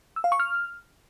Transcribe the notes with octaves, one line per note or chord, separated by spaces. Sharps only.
E6
F5
C#6
F6